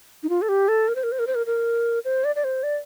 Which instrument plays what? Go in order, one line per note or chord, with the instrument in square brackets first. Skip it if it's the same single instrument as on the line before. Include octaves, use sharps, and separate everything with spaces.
[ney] D#4
F4
A4
G4
A4
A#4
C5
A#4
C5
A#4
C5
A#4
A#4
C5
D5
D5
C5
D5